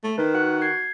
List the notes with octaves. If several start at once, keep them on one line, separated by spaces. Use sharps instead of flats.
A3
D#3 A#4 B4
F#4 F#5 F#6
G6 G#6 C7